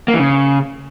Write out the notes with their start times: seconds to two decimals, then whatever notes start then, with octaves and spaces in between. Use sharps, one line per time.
0.08 A#3
0.14 E3
0.20 C#3